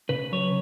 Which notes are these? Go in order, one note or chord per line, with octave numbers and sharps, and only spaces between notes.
C#3 B4
F#3 C#5